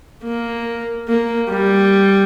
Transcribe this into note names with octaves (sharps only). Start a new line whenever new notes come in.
A#3
A#3
G3